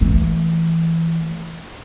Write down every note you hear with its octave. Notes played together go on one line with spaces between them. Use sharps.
E3 A3